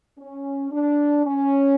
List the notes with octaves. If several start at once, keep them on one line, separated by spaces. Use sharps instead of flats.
C#4
D4
C#4